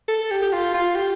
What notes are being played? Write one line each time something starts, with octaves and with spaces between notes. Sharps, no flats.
A4
G4
G4
F4
F4
G4